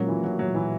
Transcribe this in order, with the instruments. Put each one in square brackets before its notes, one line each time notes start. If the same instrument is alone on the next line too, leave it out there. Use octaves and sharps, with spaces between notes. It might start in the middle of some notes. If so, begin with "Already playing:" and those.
Already playing: [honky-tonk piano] A#2 G#3 C#4 F#4 [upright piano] F#3 A#3
[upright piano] E3
F#3
F#3
E3